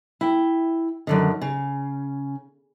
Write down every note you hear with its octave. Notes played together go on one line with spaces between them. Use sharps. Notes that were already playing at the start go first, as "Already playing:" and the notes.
E4 G5
F#2 D3 D#3
C#3